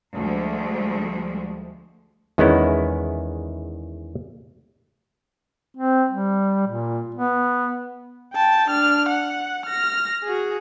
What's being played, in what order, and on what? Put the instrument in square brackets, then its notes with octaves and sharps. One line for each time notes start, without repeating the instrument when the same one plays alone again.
[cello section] D2 F3 G3 G#3
[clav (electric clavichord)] E2 D#3 G#3 B3 C#4 E4
[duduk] C4
G3
A#2
B3
[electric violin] G5 A5
D4 F6
F#5
F6 A#6
F#4 G#4